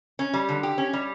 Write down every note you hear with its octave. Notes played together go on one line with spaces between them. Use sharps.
C#4
G3
D3
G4
C#4
G3